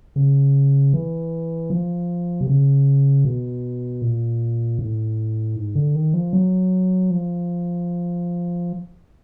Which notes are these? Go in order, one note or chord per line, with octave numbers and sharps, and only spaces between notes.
C#3
E3
F3
C3
C#3
B2
A#2
A2
G#2
D3
D#3
F3
F#3
F3